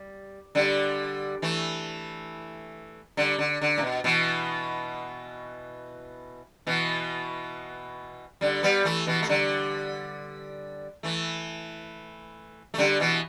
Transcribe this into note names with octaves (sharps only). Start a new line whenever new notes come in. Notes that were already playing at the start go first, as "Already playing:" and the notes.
Already playing: G3
D3 G3
E3 A3
D3 G3
D3
D3
A2
B2
B2 E3
B2 E3
D3 G3
G3 B3
E3 A3
B2 E3
A3
D3 G3
E3 A3
A3
D3 G3
B2 E3